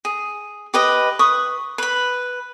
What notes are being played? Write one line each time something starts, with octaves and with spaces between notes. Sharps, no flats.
G#4
G4 B4 D#5
B4 C#6 D#6
B4 B5